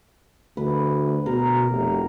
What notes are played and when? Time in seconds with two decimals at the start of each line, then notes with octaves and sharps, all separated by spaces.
0.57 D2 B4
1.26 B2 A#4
1.71 F1